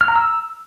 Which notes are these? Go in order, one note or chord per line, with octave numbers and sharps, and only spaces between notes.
F6
A#5
E6